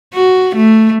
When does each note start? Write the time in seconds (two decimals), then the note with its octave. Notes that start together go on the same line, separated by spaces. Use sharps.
0.14 F#4
0.56 A3